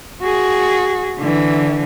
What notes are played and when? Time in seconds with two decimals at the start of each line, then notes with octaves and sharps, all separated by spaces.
0.22 F#4 G#4
1.19 D3 E3